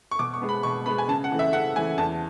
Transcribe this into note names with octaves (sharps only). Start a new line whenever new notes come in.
C#6
B2 D6
C#6
G#3 B3
B5
B2 C#6
G#3 B3 B5
G#5
C#3 A5
F#5
E3 A3
E5
C#3 F#5
E3 A3 G#5
E2 A5